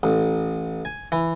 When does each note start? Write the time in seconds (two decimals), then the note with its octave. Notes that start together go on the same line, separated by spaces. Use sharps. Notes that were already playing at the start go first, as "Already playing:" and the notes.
0.03 A1
0.85 G#5
1.12 E3